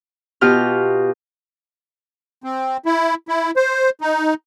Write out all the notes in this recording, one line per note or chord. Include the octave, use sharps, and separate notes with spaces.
B2 F4 G4 F6
C4
E4
E4
C5
D#4